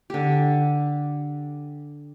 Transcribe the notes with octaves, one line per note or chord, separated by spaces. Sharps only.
D3 G4